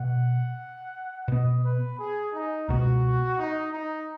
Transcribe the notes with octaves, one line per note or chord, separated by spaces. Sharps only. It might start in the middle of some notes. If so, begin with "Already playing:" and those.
Already playing: B2 B3 F#5
B2 B3 D#5
B4
G#4
D#4
C#2 B2 B3 F#4
D#4
D#4